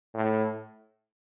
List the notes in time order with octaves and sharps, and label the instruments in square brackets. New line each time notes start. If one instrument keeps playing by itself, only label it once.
[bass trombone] A2